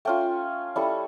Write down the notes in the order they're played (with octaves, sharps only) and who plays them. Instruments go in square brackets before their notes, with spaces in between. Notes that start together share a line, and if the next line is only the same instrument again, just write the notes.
[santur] A3 C#4 F4 G5
G3 C#4 E4 A4